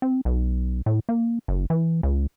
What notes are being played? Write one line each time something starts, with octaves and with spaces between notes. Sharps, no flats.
C4
B1
A2
A#3
F#1
E3
C#2